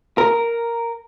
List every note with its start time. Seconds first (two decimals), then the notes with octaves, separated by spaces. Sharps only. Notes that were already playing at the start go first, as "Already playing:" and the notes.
0.18 A#4